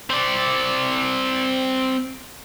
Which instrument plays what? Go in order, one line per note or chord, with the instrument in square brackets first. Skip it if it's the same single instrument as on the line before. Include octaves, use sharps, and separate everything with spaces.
[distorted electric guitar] C4 D5